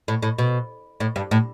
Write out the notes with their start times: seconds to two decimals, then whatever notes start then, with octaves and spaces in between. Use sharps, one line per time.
0.08 A2
0.23 A2
0.38 B2
1.00 A2
1.16 G2
1.31 A2